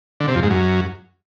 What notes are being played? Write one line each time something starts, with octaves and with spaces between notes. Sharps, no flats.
D3
C3
F2
G#2
F#2